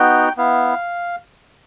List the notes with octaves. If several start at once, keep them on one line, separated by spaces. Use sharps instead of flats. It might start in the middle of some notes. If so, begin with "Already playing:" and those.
Already playing: B3 D#4 F#4 G5
B3 E4 F5